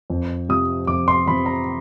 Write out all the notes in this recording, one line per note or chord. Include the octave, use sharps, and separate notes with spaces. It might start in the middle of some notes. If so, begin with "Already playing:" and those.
F2
C3 F3 D#6
F2 D6
C6
C3 F3 B5
A#5